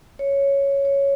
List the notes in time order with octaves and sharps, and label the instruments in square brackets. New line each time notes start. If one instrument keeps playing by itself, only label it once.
[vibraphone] C#5
C#5